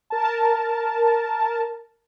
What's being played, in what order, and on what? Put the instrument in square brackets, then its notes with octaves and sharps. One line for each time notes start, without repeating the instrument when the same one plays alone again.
[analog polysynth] A#4 A5